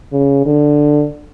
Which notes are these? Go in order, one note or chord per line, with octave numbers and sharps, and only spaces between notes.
C#3
D3